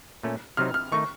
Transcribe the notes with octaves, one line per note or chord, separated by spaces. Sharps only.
A#2 A3 C#4
C3 F#3 C4 D#4 F6
F6
D#3 A3 D#4 C#6